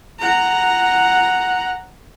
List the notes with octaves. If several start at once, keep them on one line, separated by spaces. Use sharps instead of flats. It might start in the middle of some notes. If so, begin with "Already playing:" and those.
F#5 A#5